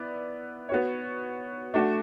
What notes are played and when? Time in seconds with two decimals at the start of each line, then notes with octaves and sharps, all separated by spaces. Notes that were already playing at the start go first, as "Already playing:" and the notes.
Already playing: B3 E4 B4 D5
0.69 B3 F#4 C#5
1.74 A3 D4 F#4